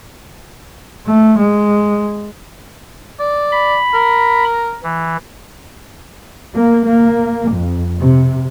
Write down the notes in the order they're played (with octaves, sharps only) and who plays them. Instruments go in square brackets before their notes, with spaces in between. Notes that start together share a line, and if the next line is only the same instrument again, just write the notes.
[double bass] A3
G#3
[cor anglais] D5
[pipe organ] B5
[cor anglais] A#4
[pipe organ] E3
[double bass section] A#3
A#3
F2
C3